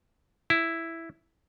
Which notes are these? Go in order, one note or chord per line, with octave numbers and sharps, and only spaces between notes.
E4